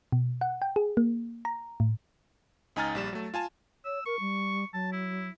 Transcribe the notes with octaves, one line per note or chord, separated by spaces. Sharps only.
B2
F#5
G5
G#4
A#3
A#5
A2
C#2 D#4 G#5 A#5 F6 A6
A#1 G3 E7
F#3 A3
F4 G#5 A5
C#5 E6
A#4 C#6
G3
F#3 A5
E4